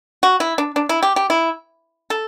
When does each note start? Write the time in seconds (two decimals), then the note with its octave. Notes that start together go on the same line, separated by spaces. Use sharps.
0.23 F#4
0.40 E4
0.58 D4
0.76 D4
0.89 E4
1.03 G4
1.16 G4
1.30 E4
2.10 A4